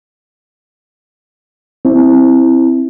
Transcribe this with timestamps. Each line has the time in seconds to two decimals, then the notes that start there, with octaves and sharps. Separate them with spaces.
1.85 C4 E4